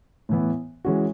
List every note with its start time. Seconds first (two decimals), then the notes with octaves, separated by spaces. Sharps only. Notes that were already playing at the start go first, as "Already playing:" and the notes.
0.29 A2 E3 B3
0.85 E3 G#3 C#4 F#4